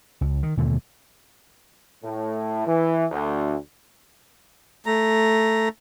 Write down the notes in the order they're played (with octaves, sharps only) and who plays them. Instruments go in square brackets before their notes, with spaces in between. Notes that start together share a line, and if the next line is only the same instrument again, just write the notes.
[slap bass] C#2
D#3
D#2 B2 D3 A3
[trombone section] A2
E3
D2
[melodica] A3 A#5